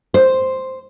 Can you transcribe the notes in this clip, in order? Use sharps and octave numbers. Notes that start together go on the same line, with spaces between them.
C5